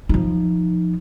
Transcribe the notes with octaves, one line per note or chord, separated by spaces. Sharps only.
F3 D#4